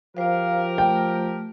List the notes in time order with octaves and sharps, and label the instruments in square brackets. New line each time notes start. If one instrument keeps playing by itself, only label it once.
[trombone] F3 [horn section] G4 A#4 [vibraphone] C5 F5
[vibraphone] A3 [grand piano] G5